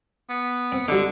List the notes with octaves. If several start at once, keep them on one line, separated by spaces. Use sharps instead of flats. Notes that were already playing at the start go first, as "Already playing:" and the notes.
B3
C4
D3 F#3 G3 D#4